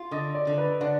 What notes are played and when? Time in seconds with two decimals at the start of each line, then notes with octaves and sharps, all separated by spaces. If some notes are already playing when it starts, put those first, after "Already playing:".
Already playing: F4
0.11 D3 D#5
0.35 D5
0.47 D3
0.58 B4
0.81 D3 D5